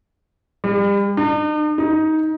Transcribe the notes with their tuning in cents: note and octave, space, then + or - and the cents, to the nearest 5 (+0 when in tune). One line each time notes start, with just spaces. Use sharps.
G3 +40
D#4 -45
D#4 +15